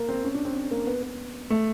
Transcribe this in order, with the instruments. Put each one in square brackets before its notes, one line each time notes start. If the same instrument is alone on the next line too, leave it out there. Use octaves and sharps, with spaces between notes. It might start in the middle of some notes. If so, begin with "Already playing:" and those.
Already playing: [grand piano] A#3
C4
C#4
D4
C4
C4
A#3
B3
B3
A3